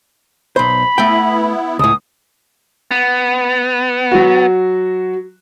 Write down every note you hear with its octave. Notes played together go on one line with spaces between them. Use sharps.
B1 C5 B5
A3 B3 E4 G5
C#2 A2 D#6
B3
F#3 F#4